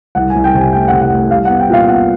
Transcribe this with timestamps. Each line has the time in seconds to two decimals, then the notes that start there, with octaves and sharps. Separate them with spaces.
0.15 C2 F#5
0.30 G#5
0.35 C2
0.44 G5
0.54 C3 G#5
0.72 A3 G5
0.88 F#5
0.92 C3
1.02 F#5
1.12 A3
1.30 G3 F5
1.45 F#5
1.50 B3
1.60 G5
1.69 A#2 F5
1.88 B3 F#5